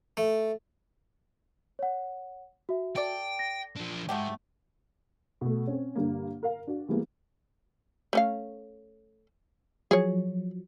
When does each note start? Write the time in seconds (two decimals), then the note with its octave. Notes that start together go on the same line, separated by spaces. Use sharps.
0.17 A3
1.79 C#5 F#5
2.69 F#4 E5
2.96 A4 D5 G5
3.39 A#6
3.77 F3 D4
4.09 G#2 A3 F#4 G4
5.41 B2 A3
5.67 C4 C#4
5.96 G2 D3 G3 A#3
6.43 A#4 F5
6.67 D4 F#4
6.88 E3 G3 G#3 A#3 B3 E4
8.13 A3 C#4 F5
9.91 F3 F#3 G#4 C#5